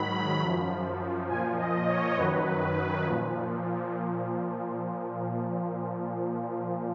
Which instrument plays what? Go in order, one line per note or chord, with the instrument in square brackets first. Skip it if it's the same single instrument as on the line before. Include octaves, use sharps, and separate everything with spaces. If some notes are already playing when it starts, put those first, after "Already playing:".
Already playing: [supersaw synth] G#2 D#3 F#3 B5
F#2 F3
A#2 G#5
F3
D#5
C#5
F#2 D#3 F#3 B4
A#2 F3